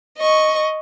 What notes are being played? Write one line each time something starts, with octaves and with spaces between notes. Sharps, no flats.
D#5 C#6